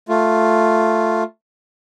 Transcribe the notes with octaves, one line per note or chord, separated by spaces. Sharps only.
A3 F4